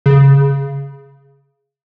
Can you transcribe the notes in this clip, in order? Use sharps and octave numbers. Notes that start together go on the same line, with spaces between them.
C#3